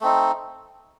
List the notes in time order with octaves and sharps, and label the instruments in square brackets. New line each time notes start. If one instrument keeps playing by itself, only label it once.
[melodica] A3 C4 D#4